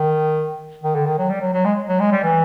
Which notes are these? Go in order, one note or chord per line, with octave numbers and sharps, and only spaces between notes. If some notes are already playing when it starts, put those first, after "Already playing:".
Already playing: D#3
D#3
D3
D#3
F#3
G3
F#3
F#3
G#3
F#3
G#3
G3
E3